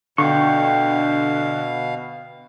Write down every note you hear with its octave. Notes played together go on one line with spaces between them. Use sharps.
B2 D3 F5 G5 C#6